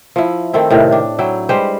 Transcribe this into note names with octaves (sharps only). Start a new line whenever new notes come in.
F3 E4
D#3 A3 C4 E4
A2 C3 D#3
D4
F#3 E4 G5
G3 G#3 B4 C5